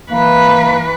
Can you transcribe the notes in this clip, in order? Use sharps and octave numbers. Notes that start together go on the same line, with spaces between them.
E3 A#3 B4